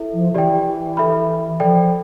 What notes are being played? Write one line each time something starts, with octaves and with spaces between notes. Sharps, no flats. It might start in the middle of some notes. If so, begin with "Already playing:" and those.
Already playing: E4 A4 E5
F3
E3 G4 D5 G5
A4 E5 B5
F3 A4 D5 G5